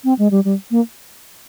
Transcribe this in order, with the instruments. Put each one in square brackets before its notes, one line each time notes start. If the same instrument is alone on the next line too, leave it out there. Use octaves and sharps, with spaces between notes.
[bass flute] C4
G#3
G3
G3
A#3